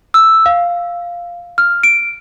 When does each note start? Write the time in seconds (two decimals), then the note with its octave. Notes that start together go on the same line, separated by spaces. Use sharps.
0.14 E6
0.46 F5
1.58 F6
1.83 D7